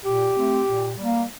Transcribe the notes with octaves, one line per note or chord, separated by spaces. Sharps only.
A#2 G4
A3 C4
A#2
G3 A#3